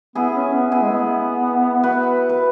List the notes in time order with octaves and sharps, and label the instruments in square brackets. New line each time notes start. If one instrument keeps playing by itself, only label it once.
[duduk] B3 [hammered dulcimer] E4 G#4
[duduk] C#4
B3
[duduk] B3 [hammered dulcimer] E4 G#4
[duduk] G#3
B3
[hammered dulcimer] F#4 B4
B4